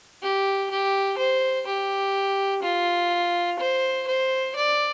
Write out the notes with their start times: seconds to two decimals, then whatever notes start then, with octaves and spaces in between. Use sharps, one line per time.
0.23 G4
0.71 G4
1.18 C5
1.67 G4
2.63 F4
3.59 C5
4.08 C5
4.56 D5